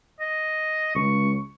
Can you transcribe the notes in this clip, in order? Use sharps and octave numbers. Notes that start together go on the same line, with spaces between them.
D#5
C#2 C#6